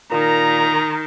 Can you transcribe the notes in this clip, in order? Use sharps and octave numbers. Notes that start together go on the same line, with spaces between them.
A#2 D#3 A#5